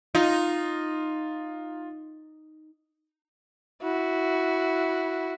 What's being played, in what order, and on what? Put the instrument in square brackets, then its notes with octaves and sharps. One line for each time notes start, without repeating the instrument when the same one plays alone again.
[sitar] D#4 [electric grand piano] F4
[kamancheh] E4 F#4